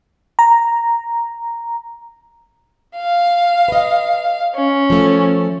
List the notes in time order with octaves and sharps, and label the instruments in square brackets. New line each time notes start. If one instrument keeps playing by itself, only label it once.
[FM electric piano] A#5
[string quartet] F5
[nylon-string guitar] B4 D#5
[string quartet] C#4
[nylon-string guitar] F3 A3